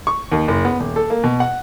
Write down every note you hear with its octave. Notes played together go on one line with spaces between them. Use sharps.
C#6
D#2
F#1
B3
D#1
A4
A#3
B2
F#5